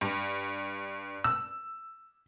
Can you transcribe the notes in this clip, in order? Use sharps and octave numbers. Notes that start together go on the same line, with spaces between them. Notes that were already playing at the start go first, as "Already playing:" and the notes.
G2
E6